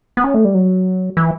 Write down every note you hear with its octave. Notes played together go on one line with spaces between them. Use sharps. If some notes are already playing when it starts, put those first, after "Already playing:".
B3
C#4
A3
G3
F#3
E3